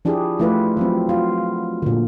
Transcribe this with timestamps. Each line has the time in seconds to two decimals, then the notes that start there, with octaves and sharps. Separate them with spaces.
0.05 F3 D4 E4 G4 G#4
0.39 F3 A3 E4 F4 B4
0.77 F3 F#3 C4
1.09 F4 F#4
1.82 A#2 D3